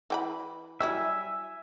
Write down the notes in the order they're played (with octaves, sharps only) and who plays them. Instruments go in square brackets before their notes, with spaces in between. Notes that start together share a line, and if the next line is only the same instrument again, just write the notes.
[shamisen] E3 G5 B5
[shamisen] F#3 G3 E4 [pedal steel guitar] E5 G#5